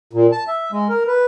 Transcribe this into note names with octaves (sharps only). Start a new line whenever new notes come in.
A#2
A5
E5
G#3
A#4
B4